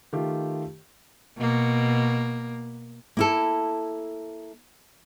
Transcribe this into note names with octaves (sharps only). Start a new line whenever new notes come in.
D#3 A3 F4 G4
B2 A#3
A#3 E4 A4